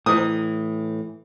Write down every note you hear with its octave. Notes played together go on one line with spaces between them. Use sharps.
A2 E3 D#6